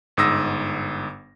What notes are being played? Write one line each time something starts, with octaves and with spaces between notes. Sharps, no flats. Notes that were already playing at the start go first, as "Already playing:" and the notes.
G1 G#2 D#6 E6 A#6